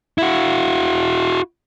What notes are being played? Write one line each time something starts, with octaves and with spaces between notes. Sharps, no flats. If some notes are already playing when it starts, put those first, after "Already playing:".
E4 F#4